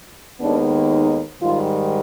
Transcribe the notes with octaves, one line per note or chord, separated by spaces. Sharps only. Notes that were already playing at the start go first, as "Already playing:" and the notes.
D#2 D#3 G#3 B3 D4
D#4
G#2 D#3 G3 F4